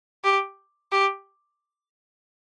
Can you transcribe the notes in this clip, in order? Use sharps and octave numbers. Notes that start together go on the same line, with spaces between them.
G4
G4